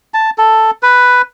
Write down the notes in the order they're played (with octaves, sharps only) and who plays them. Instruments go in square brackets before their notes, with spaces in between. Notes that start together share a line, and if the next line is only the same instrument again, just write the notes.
[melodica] A5
A4
B4